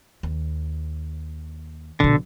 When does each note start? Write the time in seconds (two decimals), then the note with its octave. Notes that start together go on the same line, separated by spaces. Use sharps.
0.23 D#2
2.00 A#1 B2 D3